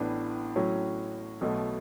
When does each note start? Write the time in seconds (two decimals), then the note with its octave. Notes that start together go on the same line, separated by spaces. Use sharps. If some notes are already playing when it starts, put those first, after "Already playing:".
Already playing: A1 A2 E3 B3 D4
0.56 A2 F#3 C#4
1.41 B1 B2 A3